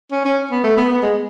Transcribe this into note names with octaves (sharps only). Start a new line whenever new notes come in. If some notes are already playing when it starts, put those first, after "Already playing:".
C#4
C#4
B3
A3
B3
B3
G#3